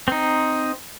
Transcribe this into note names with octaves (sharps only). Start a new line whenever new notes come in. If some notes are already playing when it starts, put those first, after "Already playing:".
C4 D#4